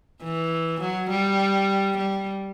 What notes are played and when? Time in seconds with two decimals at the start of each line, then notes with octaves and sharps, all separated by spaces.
0.23 E3
0.80 F#3
1.10 G3
1.97 G3